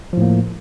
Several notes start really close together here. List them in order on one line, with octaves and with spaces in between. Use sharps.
F3 A2 A#3